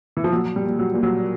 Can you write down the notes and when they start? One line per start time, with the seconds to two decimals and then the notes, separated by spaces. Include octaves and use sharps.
0.17 E3
0.24 F3
0.33 A#2 F#3
0.56 G3
0.64 A#2
0.79 F#3
0.94 A#2
1.03 F#3